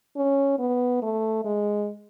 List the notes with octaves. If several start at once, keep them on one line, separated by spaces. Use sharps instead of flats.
C#4
B3
A3
G#3